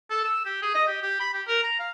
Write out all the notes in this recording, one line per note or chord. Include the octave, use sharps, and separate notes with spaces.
A4
E6
G4
G#4
D#5
G4
G4
B5
G4
A#4
A#5
F5